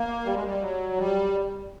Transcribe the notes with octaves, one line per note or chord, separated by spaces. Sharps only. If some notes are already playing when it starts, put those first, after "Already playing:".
Already playing: A#3
G3
G#3
G3
F#3
G3